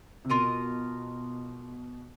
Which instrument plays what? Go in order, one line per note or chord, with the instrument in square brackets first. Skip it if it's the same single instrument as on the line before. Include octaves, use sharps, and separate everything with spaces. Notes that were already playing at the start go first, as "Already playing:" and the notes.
[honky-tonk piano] C3
[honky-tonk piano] B2 [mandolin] F4 A#4 D#5